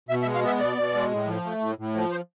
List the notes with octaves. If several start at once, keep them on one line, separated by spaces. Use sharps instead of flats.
B2 E5
E5
G#3
F5
B3 E5
B2 D5
B2
G#3
A2
F3
A3
A2
A2
F3
C5